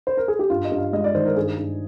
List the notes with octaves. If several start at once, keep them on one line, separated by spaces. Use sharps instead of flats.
C5
A#4
G#4
G4
G2 F4
D#5
G2
F5
G#3 D#5
D5
D#3 C5
A#4
G2 G#4
G2